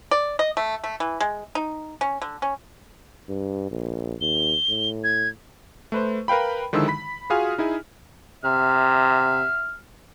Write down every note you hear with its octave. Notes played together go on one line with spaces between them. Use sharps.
D5
D#5
A3
A3
E3
G#3
D#4
C#4
D3
C#4
G2
A#1
D#2 G7
A2
G#6
A3 B4 C5
A#4 B4 F5 G5 B5
D3 D#3 F3 G#3 E4 E6
B5 B6
F4 F#4 G#4 F5 G#5 F6
D#4 E4 G#4 G#5
C3 E5 F6